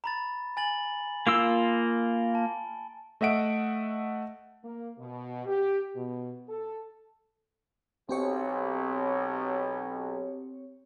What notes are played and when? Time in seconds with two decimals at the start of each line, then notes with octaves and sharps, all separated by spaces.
0.04 A#5 B5 A6
0.57 G#5 A6 F#7
1.27 A#3 F4 E6 D7 G7
2.35 A5
3.21 A3 D#5 E5 F#5 D7
4.63 A#3
4.99 B2
5.47 G4
5.96 B2
6.48 A4
8.09 B1 B2 C4 G4 C#5